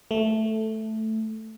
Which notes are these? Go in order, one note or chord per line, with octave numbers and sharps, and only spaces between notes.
A3